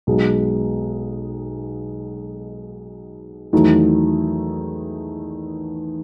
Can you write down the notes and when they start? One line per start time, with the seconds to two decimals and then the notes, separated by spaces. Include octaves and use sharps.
0.07 B1 B2 G#3
3.53 E2 D#3 F#3 A3 E4